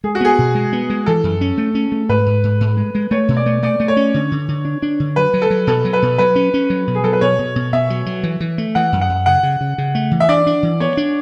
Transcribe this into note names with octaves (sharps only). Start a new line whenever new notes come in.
G#3 G#4
F#4
B3 G#4
B2
G#3
B3
G#3
E3 A4
F#2
C#4
A3
C#4
A3
G#2 B4
G#2
G#2
G#2
G#3
G#3
A3 C#5
B2
D5
A3
A3 D5
A3
C#5
C#4
D3
D3
D3
D4
D4
D3
F#3 B4
F#3
A4
F#3
B2 A4
F#3
B4
B2
F#3 B4
C#4
C#4
F#3
B2
G#4
F#3 A4
B4
B2 C#5
B2
B2
B2 E5
F#3
F#3
E3
E3
A3
E3 F#5
F#2
F#5
F#2
C#3 F#5
C#3
C#3
C#3
A3
E3
E5
D4 D5
D4
E3
B3 C#5
D4